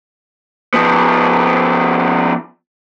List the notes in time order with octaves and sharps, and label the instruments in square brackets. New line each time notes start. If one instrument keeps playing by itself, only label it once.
[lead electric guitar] F3 B3